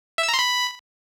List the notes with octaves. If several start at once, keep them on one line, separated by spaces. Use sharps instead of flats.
E5
E6
A#5
C6
B5